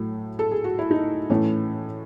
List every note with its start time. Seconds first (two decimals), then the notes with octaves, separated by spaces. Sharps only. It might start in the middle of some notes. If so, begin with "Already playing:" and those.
Already playing: A2 F#3 A3
0.39 A4
0.51 G#4
0.64 F#4
0.79 E4
0.91 D#4
1.30 A2 E3 A3 C#4